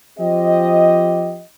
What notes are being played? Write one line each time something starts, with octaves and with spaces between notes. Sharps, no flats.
F3 C4 G4 D#5